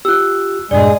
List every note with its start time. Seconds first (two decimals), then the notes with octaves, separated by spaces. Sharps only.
0.05 F4 G4 E6 F#6
0.71 E2 G2 A#2 G#3 G#4 D5 D#5